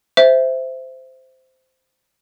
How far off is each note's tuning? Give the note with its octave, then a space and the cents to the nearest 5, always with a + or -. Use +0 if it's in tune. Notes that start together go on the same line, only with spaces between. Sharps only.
C5 -10 E5 +0